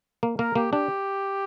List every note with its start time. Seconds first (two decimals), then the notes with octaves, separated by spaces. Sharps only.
0.23 A#3
0.39 A#3 A#4
0.56 A#3 G4
0.72 D4 G4